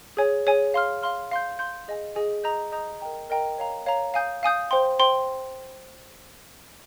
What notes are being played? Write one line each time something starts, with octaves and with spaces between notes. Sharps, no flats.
G#4 C#5 G#5
G#4 C#5 G#5
F5 C6 F6
F5 C6 F6
F5 C6 G6
F5 C6 G6
G#4 D#5 G#5
G#4 D#5 G#5
D#5 A#5 D#6 G6
D#5 A#5 D#6 G6
A#4 D#5 G5 A#5
A#4 D#5 G5 A#5
C#5 F5 A#5
C#5 F5 A#5
F5 G#5 D#6 G6
F5 G#5 D#6 G6
C5 G5 C6
C5 G5 C6